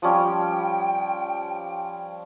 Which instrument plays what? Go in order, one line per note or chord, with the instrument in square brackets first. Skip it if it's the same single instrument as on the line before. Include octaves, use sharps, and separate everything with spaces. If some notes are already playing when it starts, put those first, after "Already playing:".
[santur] F3 G3 C#4 [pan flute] G5